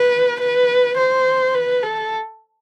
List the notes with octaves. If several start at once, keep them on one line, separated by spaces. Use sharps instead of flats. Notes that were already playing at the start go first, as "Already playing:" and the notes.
Already playing: B4
B4
C5
B4
A4